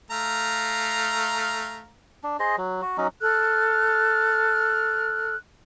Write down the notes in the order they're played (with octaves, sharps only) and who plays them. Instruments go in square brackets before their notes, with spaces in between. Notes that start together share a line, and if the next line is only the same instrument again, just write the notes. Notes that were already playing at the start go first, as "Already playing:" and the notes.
[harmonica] A3 F5 A#5
[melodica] D4
G#4 C5 D#5
F#3
F#4
F#3 C#4 D#4
[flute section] A4 F6 F#6